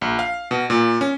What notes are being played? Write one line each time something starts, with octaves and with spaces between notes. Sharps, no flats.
A#1
F5
B2
A#2
C#4